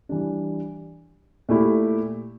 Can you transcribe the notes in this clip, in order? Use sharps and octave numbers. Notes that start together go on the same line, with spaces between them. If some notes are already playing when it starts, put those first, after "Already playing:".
E3 G3 D4
A#2 A3 E4 G4